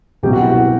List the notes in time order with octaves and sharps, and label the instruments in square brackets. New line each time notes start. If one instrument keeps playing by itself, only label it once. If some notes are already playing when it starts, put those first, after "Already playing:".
[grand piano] C2 B2 F#3 G4
F#4
E4
F#4